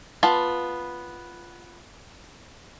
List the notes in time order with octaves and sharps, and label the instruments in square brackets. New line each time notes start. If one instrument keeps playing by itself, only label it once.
[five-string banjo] B3 F4 A5 B5